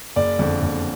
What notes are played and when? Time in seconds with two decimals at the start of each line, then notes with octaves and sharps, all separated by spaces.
0.16 F#1 D5
0.39 F2 D3
0.62 F#1